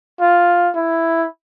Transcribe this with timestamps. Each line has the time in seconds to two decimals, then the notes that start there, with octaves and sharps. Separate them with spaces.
0.20 F4
0.76 E4